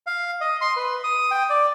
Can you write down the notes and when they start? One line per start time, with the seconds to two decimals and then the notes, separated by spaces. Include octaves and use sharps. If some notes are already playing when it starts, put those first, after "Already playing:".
0.06 F5
0.41 D#5
0.61 C6
0.77 B4
1.04 D#6
1.31 G5
1.50 D5